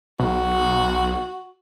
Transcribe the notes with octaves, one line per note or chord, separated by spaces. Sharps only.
B1 F#4